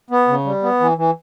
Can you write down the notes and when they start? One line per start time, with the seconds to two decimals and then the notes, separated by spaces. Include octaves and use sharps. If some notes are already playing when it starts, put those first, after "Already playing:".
0.10 B3
0.28 C#3
0.45 G3
0.63 B3
0.80 E3
0.97 E3